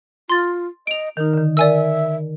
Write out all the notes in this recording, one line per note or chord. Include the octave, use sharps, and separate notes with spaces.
F4 C6 A6
D#5 D7 F7
D#3 D#4 A#4
D3 D#3
A#4 D5 E5 G#5 E6